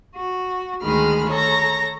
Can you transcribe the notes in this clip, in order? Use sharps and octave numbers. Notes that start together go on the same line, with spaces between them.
F#4
D2 D#3 G#3 G#4 B5 F6
A4 C#5 A#5 A#6